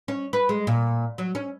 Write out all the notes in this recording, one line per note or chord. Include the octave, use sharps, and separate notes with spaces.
C#4
B4
G#3
A#2
F#3
C#4